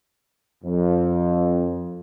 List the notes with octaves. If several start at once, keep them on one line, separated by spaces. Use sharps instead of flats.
F2